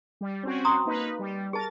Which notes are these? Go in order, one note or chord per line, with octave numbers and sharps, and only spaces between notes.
G3
C4 C#4 F#4
A#5 C6 D#6
A#3 D#4 B4
G3
G#4 A#4 A5 A6